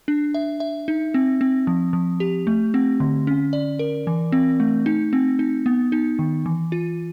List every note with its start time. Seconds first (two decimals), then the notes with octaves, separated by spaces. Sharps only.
0.08 D4
0.34 E5
0.60 E5
0.88 D#4
1.14 C4
1.41 C4
1.67 F3
1.93 F3
2.20 G4
2.47 A3
2.74 C4
3.00 D3
3.27 C#4
3.53 D5
3.79 A#4
4.07 E3
4.32 C4
4.60 A3
4.86 D#4
5.13 C4
5.39 D#4
5.66 B3
5.92 D#4
6.19 D#3
6.46 E3
6.72 F4